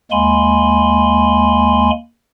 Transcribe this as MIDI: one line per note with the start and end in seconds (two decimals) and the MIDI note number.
0.11 1.90 39
0.11 1.90 56
0.11 1.90 58
0.11 1.90 80
0.11 1.90 83
0.11 1.90 84